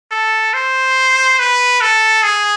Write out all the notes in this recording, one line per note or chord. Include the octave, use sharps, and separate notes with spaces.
A4
C5
B4
A4
G#4